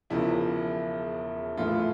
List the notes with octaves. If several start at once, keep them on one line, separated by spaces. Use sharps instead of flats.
E1 E2 C#3 F3 E4
A#1 A2 E3 A3 E4 F4